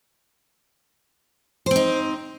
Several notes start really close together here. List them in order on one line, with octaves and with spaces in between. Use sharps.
C5 C4 D#4